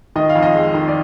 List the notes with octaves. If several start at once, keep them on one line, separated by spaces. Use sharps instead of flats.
D#3 D#5
F5
F2
D#5
G#3
D#3
D5